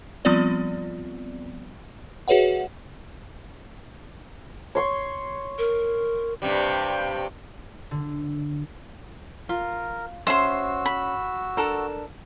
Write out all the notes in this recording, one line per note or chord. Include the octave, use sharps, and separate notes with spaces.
F3 G3 B3 C4 F4 D5
F#4 G#4 B4 C#5 E5 F#5
C#5 C6 C#6
A#4
G2 C3 G3
D3
F4 A#4
C#4 F#4 C5 E5 C6 E6
B5
D4 A4 A#4